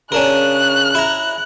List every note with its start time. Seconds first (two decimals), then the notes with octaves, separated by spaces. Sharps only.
0.12 C#3 C#4 D4 A#4 F#6
0.95 E4 A#5